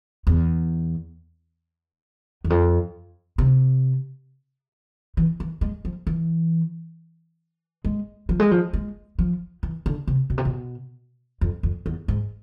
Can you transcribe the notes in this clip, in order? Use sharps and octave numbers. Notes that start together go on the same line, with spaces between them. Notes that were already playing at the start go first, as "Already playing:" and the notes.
E2
E2
F2
C3
E3
E3
G#3
F3
E3
G#3
F3
G#3
F3
G#3
F3
E3
D3
C3
B2
C3
B2
F2
F2
E2
G#2